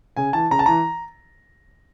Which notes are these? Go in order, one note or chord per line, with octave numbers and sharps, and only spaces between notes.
C#3 G#5
E3 A5
C#3 A#5
A5
E3 A#5